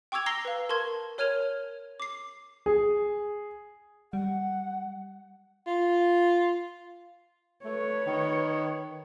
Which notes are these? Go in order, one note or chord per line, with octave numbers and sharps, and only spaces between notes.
G5 C#6 D6 E6 G#6 F7
A#5 E6 A#6 C7 G7
B4 F5
A#4 A5 C6 C#6 G#6
A#4 C#5 F6 G#6 D#7 F7
D6 C7
G#4
G3 F#5
F4
A3 B4 C#5
D#3